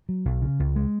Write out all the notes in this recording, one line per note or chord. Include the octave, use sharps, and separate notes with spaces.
F#3
B1
C#3
C#2
G#3